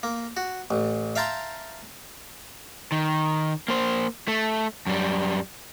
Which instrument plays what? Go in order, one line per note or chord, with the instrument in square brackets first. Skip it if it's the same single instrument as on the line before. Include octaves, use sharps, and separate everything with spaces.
[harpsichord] A#3
F#4
A1
E5 F5 G5 A5 A#5 C6
[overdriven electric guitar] D#3
A#3 C5
A3
F#2 G3